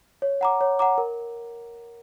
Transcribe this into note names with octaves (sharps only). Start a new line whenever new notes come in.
C#5
F#5 A#5 D6
C#5
F#5 A#5 D6
A#4